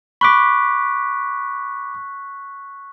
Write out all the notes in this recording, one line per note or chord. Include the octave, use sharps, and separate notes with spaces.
B5 C#6 D6 F#6 B6